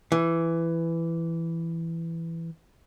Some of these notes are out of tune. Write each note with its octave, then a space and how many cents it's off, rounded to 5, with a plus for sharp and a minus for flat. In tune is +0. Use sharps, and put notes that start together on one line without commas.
E3 +10